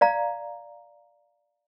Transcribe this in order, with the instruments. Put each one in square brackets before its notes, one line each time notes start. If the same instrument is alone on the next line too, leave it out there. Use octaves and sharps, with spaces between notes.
[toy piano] D5 F5 A#5